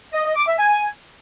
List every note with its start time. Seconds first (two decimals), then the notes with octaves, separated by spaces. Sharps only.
0.13 D#5
0.25 D#5
0.36 D6
0.47 E5
0.59 G#5